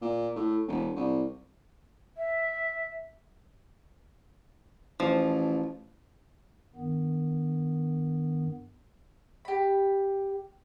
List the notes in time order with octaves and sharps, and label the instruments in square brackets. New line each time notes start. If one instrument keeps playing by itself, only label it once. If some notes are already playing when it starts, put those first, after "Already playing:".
[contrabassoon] A#2
A2
E1
C2
[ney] E5
[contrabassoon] A1 [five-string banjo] F3
[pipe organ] G2 D#3 B3
[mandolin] G4 B5